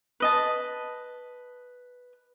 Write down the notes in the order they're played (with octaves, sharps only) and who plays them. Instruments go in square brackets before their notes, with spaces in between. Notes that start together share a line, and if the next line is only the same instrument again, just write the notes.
[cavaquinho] B4 D#5 A5